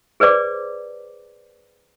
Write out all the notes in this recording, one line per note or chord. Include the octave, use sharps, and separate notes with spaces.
G#4 B4 C5 D5 D6